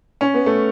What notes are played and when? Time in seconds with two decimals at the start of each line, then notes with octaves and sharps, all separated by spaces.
0.21 C#4
0.34 B3
0.46 A3